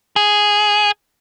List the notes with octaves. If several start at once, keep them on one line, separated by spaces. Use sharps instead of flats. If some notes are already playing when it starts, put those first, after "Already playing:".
G#4